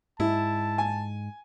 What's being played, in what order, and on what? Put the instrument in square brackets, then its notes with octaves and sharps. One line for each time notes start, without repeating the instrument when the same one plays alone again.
[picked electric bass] G#2 [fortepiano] E4 [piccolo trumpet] A5
[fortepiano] G#5